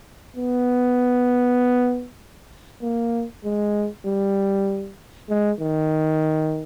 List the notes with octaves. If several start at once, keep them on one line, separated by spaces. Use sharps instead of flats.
B3
A#3
G#3
G3
G#3
D#3